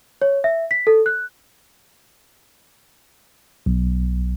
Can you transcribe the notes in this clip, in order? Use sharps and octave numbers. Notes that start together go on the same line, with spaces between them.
C#5
E5
B6
A4
F#6
B1